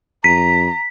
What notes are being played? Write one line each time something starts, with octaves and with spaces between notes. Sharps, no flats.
F2 A#5 B6